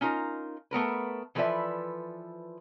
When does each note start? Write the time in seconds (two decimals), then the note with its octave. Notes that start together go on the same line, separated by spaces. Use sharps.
0.01 C#4 D#4 F4 A#4
0.71 A3 B3 A#4 B4
1.35 E3 F3 A4 B4 D5 E5